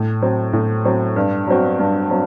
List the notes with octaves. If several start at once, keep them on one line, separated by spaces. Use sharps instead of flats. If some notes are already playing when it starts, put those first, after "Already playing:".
Already playing: A2
F#3 C4
A2
F#3 C4
G2
F#3 C4 F#4
G2
F#3 C4